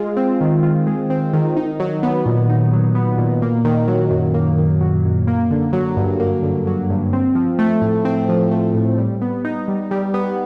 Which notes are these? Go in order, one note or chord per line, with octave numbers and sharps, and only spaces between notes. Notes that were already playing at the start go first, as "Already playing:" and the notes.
Already playing: G#3 F4
C4
D#3
F4
G#3
C4
D#3
D#4
F#3
B3
A#2
D#4
F#3
B3
A#2
A#3
D#3
F#3
F#2
A#3
D#3
F#3
F#2
A#3
D3
F#3
G2
A#3
D3
F#3
G2
C4
F3
A3
A2
C4
F3
A3
A2
G3
B3
D#4
G3
G3
B3